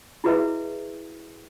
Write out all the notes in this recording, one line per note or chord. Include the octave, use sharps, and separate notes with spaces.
E4 F#4 G#4 B4 D#5 E5